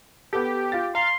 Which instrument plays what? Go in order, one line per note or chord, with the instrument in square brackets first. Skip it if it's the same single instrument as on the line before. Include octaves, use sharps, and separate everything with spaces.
[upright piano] B3 A4 [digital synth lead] G4
[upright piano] F4 F5 A6
[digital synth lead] F5 [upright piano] A#5 [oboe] C6